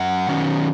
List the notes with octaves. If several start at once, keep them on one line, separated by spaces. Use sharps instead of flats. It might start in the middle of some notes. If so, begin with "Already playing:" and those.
Already playing: F#2 F#5
D#3 F#3 C#4